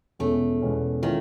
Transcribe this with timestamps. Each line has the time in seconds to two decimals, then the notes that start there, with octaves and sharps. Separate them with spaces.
0.19 E2 B2 G#3 A3 C#4
0.61 E2 B2 G#3 C#4
1.02 D#3 E3 G#3 C#4 F4